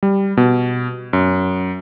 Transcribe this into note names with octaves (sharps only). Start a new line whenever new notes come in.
G3
B2
F#2